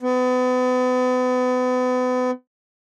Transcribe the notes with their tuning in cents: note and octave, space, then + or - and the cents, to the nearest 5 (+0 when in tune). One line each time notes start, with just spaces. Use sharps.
B3 +35